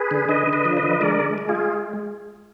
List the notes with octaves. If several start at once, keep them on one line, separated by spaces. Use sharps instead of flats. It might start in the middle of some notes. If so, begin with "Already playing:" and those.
Already playing: G#4 B4
D3
D3 B4 D#5
D3
B4 D#5
F3
B4 D#5
D3
G#3 A#4 D5
G#3
G#3
F4 G#4
G#3